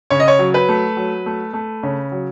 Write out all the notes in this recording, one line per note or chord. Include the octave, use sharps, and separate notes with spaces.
C#3 C#5
D#5
C#5
F#3
B4
A3
F#3
A3
A3
C#3
F#3